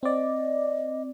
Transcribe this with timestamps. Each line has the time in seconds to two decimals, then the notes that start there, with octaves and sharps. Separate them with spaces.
0.03 C4 D5 D#5